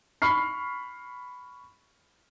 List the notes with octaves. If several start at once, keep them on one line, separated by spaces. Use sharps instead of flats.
B5 C#6 F6 C7